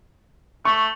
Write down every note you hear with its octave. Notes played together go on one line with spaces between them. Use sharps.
A3 C#6